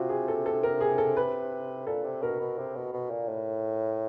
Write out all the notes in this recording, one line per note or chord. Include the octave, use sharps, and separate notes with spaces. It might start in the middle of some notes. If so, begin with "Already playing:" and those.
Already playing: C3 F4 F#4
G#4
A4
A4
A#4
G#4
A4
B4
A#2 A4
C3
B2 A#4
B2
C3
B2
B2
A#2
A2